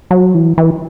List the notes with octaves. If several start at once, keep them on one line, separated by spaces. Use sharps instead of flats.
F#3
E3
E3